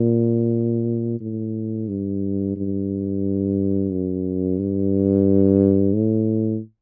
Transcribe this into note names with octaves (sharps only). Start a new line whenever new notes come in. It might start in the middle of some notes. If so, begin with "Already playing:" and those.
Already playing: A#2
A2
G2
G2
F#2
G2
A2